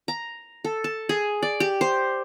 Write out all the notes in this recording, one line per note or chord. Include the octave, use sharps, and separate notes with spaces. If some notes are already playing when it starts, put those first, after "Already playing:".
A#5
A4
A5
G#4
D5
G4
C5